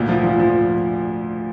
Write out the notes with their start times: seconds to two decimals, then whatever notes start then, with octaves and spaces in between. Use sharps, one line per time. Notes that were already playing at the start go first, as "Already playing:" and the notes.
Already playing: D2 A#2
0.09 F3
0.24 F3
0.39 F3